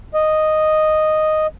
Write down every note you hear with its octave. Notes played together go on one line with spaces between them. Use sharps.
D#5